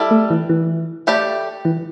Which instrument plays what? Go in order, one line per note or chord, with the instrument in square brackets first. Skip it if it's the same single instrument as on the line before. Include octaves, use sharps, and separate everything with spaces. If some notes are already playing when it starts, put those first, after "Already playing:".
Already playing: [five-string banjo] G3 E4 A4 D5
[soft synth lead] A3
E3
E3
[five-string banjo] A3 G4 D5
[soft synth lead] E3